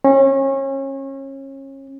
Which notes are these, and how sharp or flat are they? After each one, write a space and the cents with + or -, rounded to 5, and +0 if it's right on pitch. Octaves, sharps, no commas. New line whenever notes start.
C#4 -30